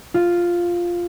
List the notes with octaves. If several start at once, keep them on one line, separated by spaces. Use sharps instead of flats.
F4